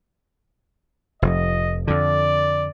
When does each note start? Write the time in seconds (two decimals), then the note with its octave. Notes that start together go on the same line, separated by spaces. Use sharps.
1.22 F1 F2 D#5
1.87 F2 D3 D5